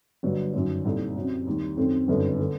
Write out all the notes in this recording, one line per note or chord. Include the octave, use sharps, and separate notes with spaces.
G1 G2 F#3
G1 F#2 D#3 F#3
C2 A#2 A3 D#4
F#2 F#3 C4
D#2 D#3 G3
F#2 D#3 A3 C4
G1 F#2 D#3 A3 D4
D3 A3